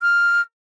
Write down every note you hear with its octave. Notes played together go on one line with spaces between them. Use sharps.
F6